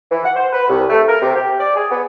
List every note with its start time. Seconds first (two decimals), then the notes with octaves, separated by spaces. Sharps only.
0.11 E3
0.24 F#5
0.36 C5
0.51 B4
0.68 C2
0.90 A3
1.08 A#4
1.21 C3
1.35 G4
1.58 D5
1.74 G#4
1.90 B3